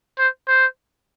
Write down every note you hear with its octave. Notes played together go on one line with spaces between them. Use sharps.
C5
C5